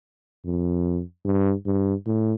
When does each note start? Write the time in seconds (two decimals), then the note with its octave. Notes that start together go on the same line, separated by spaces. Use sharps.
0.45 F2
1.25 G2
1.66 G2
2.07 A2